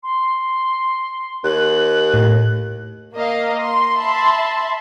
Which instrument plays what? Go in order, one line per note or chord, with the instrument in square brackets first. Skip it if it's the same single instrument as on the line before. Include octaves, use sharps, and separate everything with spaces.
[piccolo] C6
[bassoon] D#2 [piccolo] F#6
[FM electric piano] A2
[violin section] A#3 D#5 F5
C6
E5 A5 B5 C6